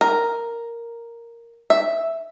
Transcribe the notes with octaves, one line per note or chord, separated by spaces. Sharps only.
A#4
E5